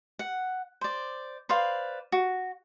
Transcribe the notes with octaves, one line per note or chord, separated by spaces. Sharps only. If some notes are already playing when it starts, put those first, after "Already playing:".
F#5
C5 D5
B4 C5 D5 F5
F#4